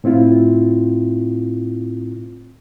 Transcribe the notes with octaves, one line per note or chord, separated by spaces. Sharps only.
A2 C4 E4 F4